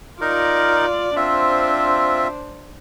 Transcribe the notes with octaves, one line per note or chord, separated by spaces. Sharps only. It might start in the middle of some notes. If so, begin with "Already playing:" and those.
D#4 F4 A#4 D5
C4 D4 F4 C5 E5